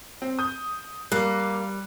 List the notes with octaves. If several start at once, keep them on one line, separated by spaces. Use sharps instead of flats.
C4
D#6 G6
G3 A#3 F#6